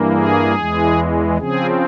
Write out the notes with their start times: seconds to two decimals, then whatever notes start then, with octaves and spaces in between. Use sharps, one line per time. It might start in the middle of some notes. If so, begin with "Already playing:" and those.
Already playing: G2 E3 A#3
0.14 G#4
0.56 E2 E3 G#3
1.37 C#3 F3 C4 G#4